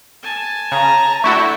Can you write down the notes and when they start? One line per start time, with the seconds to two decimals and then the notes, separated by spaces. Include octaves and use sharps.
0.23 G#5 A5
0.72 C#3 A#5
1.24 A3 D4 E4 F#4 E5 G5 C#6